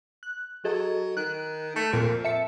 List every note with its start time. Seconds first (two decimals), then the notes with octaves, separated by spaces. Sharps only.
0.23 F#6
0.64 F#3 G#4 A4 D#5
1.17 D#3 F#6
1.76 A3
1.93 F2 A#2 A#4 D7
2.25 E5 A5 C#7